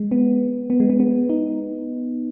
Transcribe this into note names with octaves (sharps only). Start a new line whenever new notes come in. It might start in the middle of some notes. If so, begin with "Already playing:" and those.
Already playing: G#3
B3
B3
G#3
B3
B3
D#4